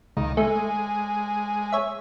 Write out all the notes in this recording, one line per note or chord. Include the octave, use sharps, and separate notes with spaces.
C#2 D#3
G#3 A3
C#5 E5